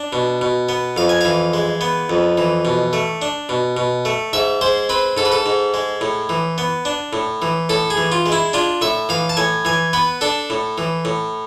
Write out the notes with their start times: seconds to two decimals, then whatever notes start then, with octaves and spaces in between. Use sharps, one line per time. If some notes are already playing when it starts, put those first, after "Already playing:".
Already playing: D4
0.13 B2
0.41 B2
0.69 B3
0.96 F2 F5
1.09 G#5
1.21 E3 F5
1.54 G#3
1.81 B3
2.10 F2
2.38 E3
2.65 B2
2.93 A3
3.22 D4
3.49 B2
3.77 B2
4.05 A3
4.33 G#2 E5
4.61 G#3 C5
4.89 C4 B4
5.17 G#2 A4
5.25 B4
5.32 A4
5.46 G#2
5.74 G#3
6.01 A2
6.29 E3
6.58 B3
6.85 D4
7.13 A2
7.42 E3
7.69 A2 A4
7.90 G#4
7.97 E3
8.12 F4
8.26 G#3
8.32 E4
8.53 D4 F4
8.81 A2 E5
9.09 E3 F5
9.29 A5
9.37 A2 G#5
9.65 E3 G#5
9.93 B3 B4
10.21 D4 A4
10.50 A2
10.78 E3
11.05 A2